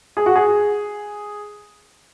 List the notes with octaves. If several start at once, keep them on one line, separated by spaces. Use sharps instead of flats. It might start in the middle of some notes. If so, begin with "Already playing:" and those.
G#4
F#4
G#4